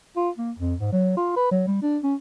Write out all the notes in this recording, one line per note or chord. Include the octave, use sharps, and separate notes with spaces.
F4
A#3
F2
G#2
F#3
F4
B4
F#3
G3
D4
C#4